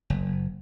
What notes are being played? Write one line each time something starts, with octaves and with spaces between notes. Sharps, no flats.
F#1